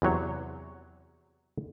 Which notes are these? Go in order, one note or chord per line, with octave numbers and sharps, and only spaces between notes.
E2 C3 F#3 C#5